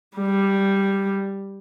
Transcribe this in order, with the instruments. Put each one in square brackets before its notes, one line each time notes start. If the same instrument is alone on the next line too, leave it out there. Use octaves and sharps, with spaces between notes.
[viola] G3